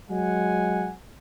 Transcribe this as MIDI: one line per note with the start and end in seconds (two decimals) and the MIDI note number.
0.10 0.92 54
0.10 0.92 56
0.10 0.92 78
0.10 0.92 80